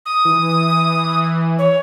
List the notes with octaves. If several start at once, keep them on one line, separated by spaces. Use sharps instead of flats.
D#6
E3
C#5